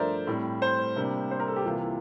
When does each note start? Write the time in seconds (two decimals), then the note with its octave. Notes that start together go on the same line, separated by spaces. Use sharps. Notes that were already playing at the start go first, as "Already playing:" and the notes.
Already playing: G2 F3 A3 D4 A#4 C5 D5 E5
0.27 A2 G3 C4
0.62 C5
0.96 C3 G3 A#3 D4
1.31 C5
1.40 A#4
1.48 A4
1.56 G4
1.65 C2 C3 E3 A#3 F4